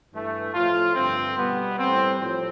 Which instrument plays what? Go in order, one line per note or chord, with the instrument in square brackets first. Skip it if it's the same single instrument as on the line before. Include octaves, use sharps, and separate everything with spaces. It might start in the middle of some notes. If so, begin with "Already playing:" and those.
[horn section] G2 E3 A3
A2 F3 A3 F4
G2 D3 F3 C4
B2 G3 B3
A2 E3 G3 C4
A2 F3 C4